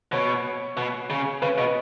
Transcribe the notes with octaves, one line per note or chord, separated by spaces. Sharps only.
B2 C#5
B2
C#3
C#3 B4
B2 D#5